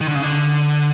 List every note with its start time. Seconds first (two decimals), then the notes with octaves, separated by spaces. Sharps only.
0.01 D#3
0.08 D3
0.15 C#3
0.22 D3